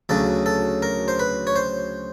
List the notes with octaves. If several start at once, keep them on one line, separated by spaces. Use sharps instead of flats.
D2 C#3 F#3 A4
A4
A#4
C5
B4
C#5
C5